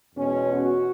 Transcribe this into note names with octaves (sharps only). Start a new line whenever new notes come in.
E2 B2 G#3 C#4
F#4